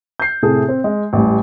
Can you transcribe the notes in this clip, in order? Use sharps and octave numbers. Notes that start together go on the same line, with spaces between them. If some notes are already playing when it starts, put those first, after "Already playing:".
G6 C7
A2 C3 G#4 A4
C4
G#3
A1 G3